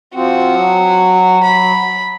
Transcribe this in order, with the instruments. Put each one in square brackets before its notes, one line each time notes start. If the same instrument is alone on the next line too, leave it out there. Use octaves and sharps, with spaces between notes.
[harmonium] F3 C4 [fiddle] F#4
[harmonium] F#3
[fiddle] B5